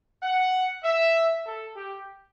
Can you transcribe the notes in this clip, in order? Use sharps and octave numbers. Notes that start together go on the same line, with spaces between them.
F#5
E5
A4
G4